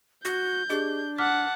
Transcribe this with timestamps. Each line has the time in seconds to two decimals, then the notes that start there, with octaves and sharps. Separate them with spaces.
0.25 F#4 G6 A#6
0.70 D4 G4 G#4 D#5
1.18 F#5 A5 D6 F6 B6